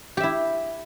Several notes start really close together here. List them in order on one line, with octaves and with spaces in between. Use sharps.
G4 E5 E4